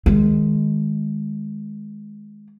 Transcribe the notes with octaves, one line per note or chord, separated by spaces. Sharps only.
D#3 G#3